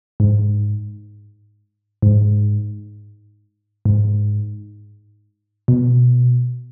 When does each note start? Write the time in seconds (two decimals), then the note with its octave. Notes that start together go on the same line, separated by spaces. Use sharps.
0.20 G#2
2.02 G#2
3.85 G#2
5.68 B2